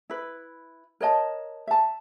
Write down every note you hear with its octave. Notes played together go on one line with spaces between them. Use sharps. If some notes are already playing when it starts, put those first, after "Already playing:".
E4 B4
A#4 C#5 D#5 A5
E5 A5